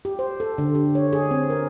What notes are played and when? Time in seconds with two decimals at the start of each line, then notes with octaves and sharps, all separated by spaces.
0.05 G4
0.19 C5
0.40 A4
0.58 D3
0.75 G4
0.95 C#5
1.13 G#4
1.31 C4
1.50 A#4